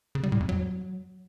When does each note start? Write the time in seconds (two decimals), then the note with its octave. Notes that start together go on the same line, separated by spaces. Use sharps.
0.15 C#3
0.23 G3
0.32 A2
0.40 F2
0.49 F#3